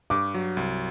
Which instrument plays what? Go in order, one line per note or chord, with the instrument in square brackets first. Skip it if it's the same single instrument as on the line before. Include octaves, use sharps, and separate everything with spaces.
[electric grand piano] G2 [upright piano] D6
[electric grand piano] F#3
C2